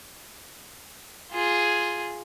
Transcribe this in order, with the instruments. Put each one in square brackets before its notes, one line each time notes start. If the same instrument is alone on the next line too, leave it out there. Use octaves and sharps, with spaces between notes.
[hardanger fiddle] F4 G#4